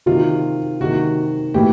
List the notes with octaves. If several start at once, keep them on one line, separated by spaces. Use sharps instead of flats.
C3 D#3 F4
C3 D#3 F#4
A2 E3 G4